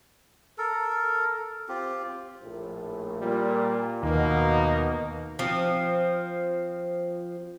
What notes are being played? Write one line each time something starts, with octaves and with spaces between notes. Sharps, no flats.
A4 A#4
C4 F4 G4
A#1 A2
A#2 G3
D#2 B2 A#3 D#4
F3 C4